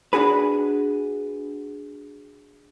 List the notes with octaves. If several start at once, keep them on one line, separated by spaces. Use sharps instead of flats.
D4 F#4 G#4 B4